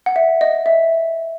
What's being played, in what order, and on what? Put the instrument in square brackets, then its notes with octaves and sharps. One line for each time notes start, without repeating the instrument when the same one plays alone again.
[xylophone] F#5
E5
D#5
E5